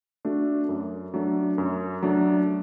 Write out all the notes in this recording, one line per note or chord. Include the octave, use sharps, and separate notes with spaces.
A3 D4 F#4
F#2
F#3 A3 D4
F#2
F#3 A3 D4